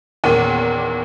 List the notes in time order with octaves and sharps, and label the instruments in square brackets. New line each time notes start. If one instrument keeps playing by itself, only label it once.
[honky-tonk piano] E2 A#2 D#3 A#3 C#4